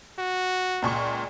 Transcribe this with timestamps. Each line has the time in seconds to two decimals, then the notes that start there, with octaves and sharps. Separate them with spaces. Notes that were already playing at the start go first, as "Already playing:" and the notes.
0.19 F#4
0.82 C#2 A#2 C#6